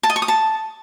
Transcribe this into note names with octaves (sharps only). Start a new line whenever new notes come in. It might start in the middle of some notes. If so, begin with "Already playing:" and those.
A5
D#5
C#6
D#6
A5